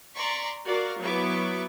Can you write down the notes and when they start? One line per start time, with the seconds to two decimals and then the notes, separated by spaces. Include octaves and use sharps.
0.15 D5 A#5 C6 C#6 B6
0.65 F#4 A#4 D5 F5
1.01 F#3 B3 E4 C#6 D6